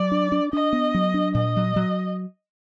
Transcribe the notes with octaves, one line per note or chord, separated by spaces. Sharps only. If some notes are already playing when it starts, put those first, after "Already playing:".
Already playing: F#3 D5
D4
D4
D4 D#5
B3
F#3
D4
A#2 D#5
F#3
F#3